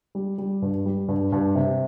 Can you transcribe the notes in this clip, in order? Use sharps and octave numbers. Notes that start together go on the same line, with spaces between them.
G3
G3
G2
G3
G2
G2
C3